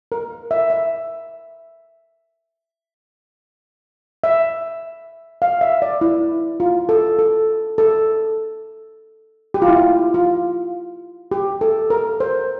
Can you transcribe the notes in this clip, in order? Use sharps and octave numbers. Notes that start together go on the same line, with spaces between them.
A#4
E5
E5
E5
F5
E5
D5
E4
F4
A4
A4
A4
G4
F4
E4
F4
F4
G4
A4
A#4
C5